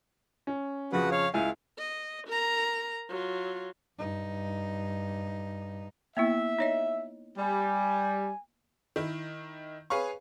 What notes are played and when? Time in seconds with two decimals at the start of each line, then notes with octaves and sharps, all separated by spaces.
0.47 C#4
0.92 F2 C#3 F3 F#4 B4
1.11 C#5 F5
1.34 C#2 E4 F5 G#5
1.78 D#5
2.27 A#4 A#5
3.09 F#3 F4
3.97 G2 D#4
6.17 A#3 B3 E4 E5
6.59 D#4 C#5 D#5
7.38 G3 G#5
8.96 D#3 E4
9.90 G#4 B4 C#5 F5 C#6